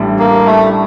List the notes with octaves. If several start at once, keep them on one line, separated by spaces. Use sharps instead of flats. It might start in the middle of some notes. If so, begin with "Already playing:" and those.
Already playing: A1 A2 G3 D4
A#3
A3